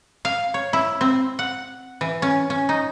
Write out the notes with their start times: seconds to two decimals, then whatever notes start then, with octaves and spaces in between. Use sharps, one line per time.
0.25 F5
0.54 C#5
0.73 E4
1.01 C4
1.39 F#5
2.01 E3
2.22 C#4
2.50 C#4
2.69 D#4